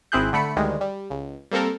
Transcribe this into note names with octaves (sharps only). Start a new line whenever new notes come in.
G#1 C4 E4 G#4 F#6 G6
D3 A3 B5 C#7
D2 D#3 G3 G#3
G3
C#2
G3 A#3 C4 A4 A#4